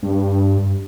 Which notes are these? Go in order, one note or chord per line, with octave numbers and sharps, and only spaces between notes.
G2